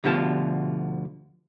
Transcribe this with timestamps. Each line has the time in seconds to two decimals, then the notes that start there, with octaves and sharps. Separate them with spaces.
0.04 D2 B2 D3 F3 G4 A5